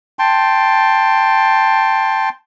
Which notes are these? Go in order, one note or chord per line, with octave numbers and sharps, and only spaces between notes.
G5 A5 C6